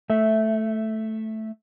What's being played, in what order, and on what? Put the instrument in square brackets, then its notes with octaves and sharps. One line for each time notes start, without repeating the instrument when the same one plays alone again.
[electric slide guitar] A3 E5